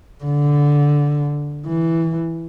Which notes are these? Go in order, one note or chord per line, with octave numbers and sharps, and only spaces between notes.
D3
E3